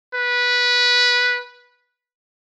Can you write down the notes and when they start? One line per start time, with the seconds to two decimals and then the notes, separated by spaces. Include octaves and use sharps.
0.14 B4